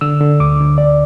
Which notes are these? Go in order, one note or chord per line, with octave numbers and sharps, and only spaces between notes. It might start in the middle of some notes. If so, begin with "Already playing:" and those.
D3 E6
D3
D2 D6
D2
D2 D5